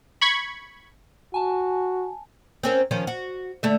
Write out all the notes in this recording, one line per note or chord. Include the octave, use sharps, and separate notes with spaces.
B5 C#6 G#6
F#4 G#5 A5
C4 C#4 A#4
D#3 F3 C#4
F#4
D3 A3 E5